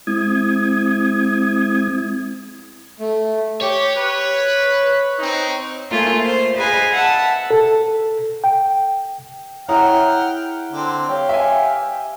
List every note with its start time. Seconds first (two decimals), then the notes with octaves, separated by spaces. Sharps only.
0.07 G#3 C4 E4 D#6 G#6
2.99 A3
3.61 G4 C#5
3.95 B4
5.20 C4 D#4
5.91 A3 A#3 F4 G#4
6.23 C5 C6
6.56 G#4 B4 D#5 F5 G#5
6.93 E5 F#5 A5
7.51 A4
8.44 G5
9.69 E4 G#4 C#5 F#5 G5 A#5 F6
10.72 D3 C4
11.09 G4 C#5 F5
11.29 E5 G#5